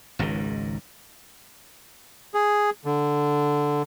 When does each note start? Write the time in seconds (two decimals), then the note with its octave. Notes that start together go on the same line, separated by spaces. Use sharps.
0.19 G#1 C#2 G#2 D#3
2.34 G#4
2.85 D3